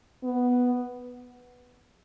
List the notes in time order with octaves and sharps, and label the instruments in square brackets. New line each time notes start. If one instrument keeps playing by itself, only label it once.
[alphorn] B3